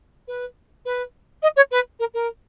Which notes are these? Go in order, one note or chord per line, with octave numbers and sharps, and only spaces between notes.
B4
B4
D#5
C#5
B4
A#4
A#4